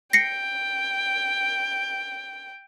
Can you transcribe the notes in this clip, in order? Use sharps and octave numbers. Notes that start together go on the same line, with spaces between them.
G5 A#6 C7 C#7